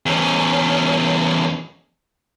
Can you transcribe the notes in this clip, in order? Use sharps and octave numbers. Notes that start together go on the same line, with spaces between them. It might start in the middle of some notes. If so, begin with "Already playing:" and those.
E2 C#4